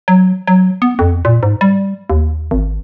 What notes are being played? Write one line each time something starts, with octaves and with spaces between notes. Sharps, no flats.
F#3
F#3
B3
F2
A#2
G#2
G3
D#2
G#1